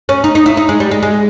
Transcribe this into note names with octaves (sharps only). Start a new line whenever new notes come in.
C#4
D#4
D#4
E4
D#4
G#3
G3
G#3
G#3